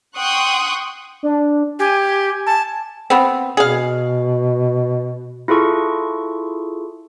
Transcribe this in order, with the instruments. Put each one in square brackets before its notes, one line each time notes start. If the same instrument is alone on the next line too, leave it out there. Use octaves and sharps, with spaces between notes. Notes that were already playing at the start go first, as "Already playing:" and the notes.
[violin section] F#5 G5 C6 C#6 D#6 F#6
[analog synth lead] D4
[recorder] G4 [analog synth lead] G#5
[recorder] A5
[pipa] B3 C4
[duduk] B2 [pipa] G#4 F5
[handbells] E4 F4 G#4 A4 C#6